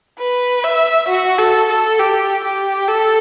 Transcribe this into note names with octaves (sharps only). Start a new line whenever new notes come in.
B4
E5
F#4
A4
A4
G4
G4
A4